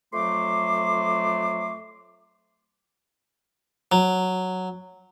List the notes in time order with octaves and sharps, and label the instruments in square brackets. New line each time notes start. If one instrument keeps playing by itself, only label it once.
[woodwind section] F2 F#3 A3 C6 D6
[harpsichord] F#3